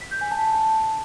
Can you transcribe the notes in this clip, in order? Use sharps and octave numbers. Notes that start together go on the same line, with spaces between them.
B6
G6
G#5
A5
A5